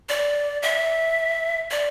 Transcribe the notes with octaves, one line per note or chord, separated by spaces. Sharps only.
D5
E5
D5